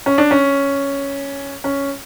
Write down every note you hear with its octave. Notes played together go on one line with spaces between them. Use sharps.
C#4
D4
C#4
C#4